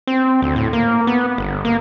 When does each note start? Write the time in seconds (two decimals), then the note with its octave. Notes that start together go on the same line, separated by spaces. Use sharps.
0.07 C4
0.42 D2
0.56 A2
0.73 A#3
1.07 B3
1.38 G1
1.65 A#3